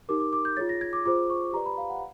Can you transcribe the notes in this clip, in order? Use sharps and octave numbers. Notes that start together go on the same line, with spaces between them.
D#4 G4 A#4 D6
D6
D6
G6
F4 G#4 C#5 A6
A#6
G#6
D6
F4 G#4 C5 D6
C#6
G4 B4 D5 A#5
B5
F5
F#5